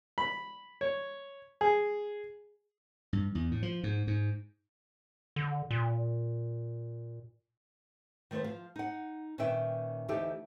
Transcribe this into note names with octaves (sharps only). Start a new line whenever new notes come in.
B5
C#5
G#4
G2
E2
A2
F3
G#2
G#2
D3
A#2
D#3 A3 B3 B4 C5
F3 F5
D#4 F#5
A#2 D#3 C#4 B4 E5 G5
D2 E3 D#4 G4 A4 E5